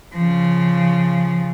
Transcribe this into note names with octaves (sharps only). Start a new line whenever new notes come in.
C#3 F3